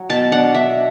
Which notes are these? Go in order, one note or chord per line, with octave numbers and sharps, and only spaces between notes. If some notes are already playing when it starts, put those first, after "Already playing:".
Already playing: F#3
B2 A5
D4 F#5
D4 E5